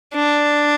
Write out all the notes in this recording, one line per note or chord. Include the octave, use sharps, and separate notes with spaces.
D4